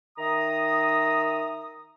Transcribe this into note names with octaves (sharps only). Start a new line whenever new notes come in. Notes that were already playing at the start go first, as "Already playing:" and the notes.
D#3 E5 A#5 D#6